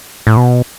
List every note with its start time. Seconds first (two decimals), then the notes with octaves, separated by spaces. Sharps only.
0.27 A2
0.37 B2